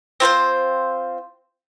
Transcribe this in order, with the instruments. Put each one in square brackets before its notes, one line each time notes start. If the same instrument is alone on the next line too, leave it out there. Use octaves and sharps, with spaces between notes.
[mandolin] C4 F4 B4 C5